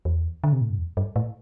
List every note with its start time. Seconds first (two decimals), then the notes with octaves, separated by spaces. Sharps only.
0.05 E2
0.44 D3
0.53 C3
0.61 A2
0.70 G2
0.78 E2
0.97 G2
1.16 A2